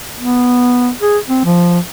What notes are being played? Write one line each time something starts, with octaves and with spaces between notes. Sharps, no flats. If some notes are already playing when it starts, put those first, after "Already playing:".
B3
G#4
C4
F3